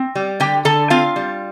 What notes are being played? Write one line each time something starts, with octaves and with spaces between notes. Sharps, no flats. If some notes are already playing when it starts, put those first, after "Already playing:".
Already playing: C4
G3
D3 G4 G5
D3 A4 A5
C4 F4 F5
G3